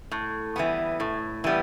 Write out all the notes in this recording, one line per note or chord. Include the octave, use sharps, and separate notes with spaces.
A2
E3 G3 B3
A2
E3 G3 B3